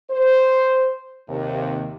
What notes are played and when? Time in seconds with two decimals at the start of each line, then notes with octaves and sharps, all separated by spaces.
0.11 C5
1.29 D#2 C3